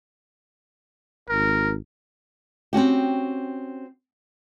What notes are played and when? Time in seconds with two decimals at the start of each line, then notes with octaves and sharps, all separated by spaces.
1.29 G#1 A#4
2.73 C4 C#4 F#4 G4